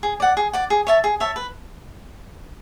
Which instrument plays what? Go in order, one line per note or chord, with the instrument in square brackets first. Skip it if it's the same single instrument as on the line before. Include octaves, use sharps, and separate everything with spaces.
[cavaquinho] G#4
D5 F#5
G#4
D5 F#5
G#4
C#5 E5 A5
G#4
C#5 E5 A5
B4